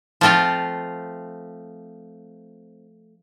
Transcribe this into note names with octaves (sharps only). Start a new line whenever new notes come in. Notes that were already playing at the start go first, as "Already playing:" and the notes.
F3 A3 C4 F4